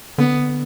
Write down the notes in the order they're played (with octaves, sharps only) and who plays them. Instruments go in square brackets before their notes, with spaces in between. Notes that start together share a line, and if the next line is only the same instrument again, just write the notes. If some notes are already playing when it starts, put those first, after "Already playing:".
[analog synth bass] D3 [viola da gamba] B3